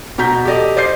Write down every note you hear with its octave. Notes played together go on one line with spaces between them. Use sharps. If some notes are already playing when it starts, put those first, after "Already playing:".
B2 F#4 A#5 G6 B6
G4 A4 D5 D#5
C5 D5 D#5 G6 C7